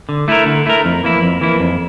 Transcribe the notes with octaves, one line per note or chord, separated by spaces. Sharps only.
D3
A3 E4 A#4
D3
A3 E4 A#4
F2
E3 A#3 E4
F2
E3 A#3 E4
F2